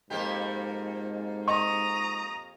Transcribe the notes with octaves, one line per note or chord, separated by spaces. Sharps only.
F2 G#2 A#3 G4
D#5 A#5 C#6 D#6